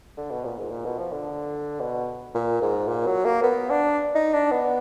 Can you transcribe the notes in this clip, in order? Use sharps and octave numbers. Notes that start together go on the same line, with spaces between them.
D3
B2
A#2
G#2
A#2
B2
F3
D3
B2
A#2
G#2
A#2
F#3
A#3
B3
D4
D#4
D4
B3